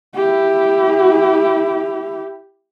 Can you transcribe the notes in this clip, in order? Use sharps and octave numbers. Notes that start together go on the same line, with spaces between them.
E4 G4